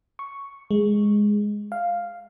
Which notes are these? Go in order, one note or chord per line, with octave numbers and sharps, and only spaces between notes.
C#6
G#3
F5